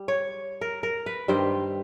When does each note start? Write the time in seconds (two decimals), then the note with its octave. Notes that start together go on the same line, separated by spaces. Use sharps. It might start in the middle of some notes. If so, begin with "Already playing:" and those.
Already playing: G3
0.08 C#5
0.61 A#4
0.83 A#4
1.06 B4
1.28 G2 D#3 G3 C5